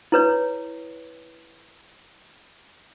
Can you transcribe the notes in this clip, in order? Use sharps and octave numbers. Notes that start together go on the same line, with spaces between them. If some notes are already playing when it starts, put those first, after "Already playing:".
E4 B4 C#5